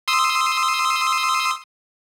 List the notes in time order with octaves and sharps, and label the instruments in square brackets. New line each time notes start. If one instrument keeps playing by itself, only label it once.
[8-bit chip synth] C6 D#6 E6